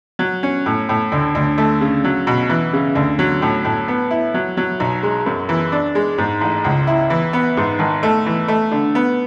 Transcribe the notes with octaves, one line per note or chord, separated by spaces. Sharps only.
F#3
C#4
A2
A2
D2
D2
A3
C#3
F#3
B2
E3
C#3
D2
F#3
A2
A2
B3
E4
F#3
F#3
B1
G#3
F#2
E3
D4
G#3
G#2
A1
C#2
E4
E3
B3
G#2
G#1
A3
E3
A3
D3
B3